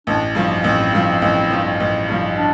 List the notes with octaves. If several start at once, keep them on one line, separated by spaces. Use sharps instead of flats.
A1 D4
G2 F3
A#3
A1 C4
G2 F3
A1
G2 F3
A1
G2 F3
D4